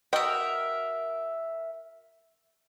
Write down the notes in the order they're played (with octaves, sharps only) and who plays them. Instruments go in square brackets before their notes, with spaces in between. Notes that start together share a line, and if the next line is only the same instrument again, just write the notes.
[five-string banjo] F#4 D#5 G5 [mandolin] A#4 E5